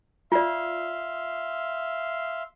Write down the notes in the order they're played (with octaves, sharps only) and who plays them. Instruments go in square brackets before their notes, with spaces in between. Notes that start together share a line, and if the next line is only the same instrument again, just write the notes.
[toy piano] F4 D5 [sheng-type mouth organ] E5 F5 C6